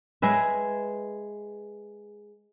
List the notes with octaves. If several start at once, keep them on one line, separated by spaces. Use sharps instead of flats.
G#3 G#4 B4 E5